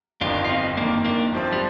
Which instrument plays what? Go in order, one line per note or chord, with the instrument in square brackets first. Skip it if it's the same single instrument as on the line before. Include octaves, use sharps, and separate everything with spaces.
[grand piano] G1 F2 D#3 [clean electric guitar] D4 F4
[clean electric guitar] F4
C4 D#4
[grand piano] G1 F2 D#3 [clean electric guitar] A#3 D4
[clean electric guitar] A#3 D4
[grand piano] G2 F3 C4
[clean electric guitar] G3